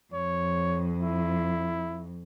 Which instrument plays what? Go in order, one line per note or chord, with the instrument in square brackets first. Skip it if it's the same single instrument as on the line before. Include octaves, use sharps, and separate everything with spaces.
[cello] F2 [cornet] C#5
[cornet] E4